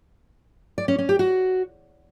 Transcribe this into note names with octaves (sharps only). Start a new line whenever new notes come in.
D5
C#4
C#4
G4
F#4